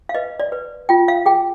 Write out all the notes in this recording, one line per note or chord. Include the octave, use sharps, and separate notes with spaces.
F5
B4 D#5
D5
B4
F4 G5
F5
G#4 G5